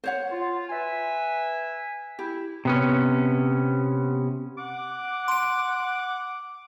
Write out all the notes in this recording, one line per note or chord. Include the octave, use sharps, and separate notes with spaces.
C5 C#5 F#5
F4
B4 E5 G#5
E4 G4
C3 B3 C#4
F#5 D6
C6 D7